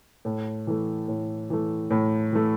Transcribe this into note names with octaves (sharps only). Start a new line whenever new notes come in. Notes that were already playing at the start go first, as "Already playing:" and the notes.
A2
E3 A3
A2
E3 A3
A2
E3 A3